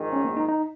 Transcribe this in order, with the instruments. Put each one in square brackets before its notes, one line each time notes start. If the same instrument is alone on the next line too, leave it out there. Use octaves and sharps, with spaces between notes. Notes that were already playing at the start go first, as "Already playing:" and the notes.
Already playing: [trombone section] A#1 G#2 D#3
[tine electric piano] C#4
A#3
D#4
D#4